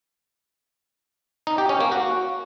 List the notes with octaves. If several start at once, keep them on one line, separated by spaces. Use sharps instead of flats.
D#4
G4
C#4
A#3
F#4